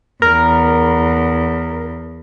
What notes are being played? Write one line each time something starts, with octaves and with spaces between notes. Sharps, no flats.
E2 A#4